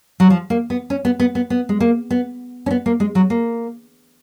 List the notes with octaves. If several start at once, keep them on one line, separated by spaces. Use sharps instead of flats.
F#3
F3
A#3
B3
C#4
B3
B3
B3
B3
G#3
A#3
B3
C#4
B3
A#3
G#3
F#3
A#3